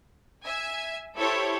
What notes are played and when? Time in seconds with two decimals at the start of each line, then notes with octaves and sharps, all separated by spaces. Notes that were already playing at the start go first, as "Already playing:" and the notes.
0.43 E5 G#5
1.17 E4 G4 A4 C5 C#5